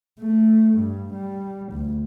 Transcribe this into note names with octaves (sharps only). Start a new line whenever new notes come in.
A3
G2
G3
D2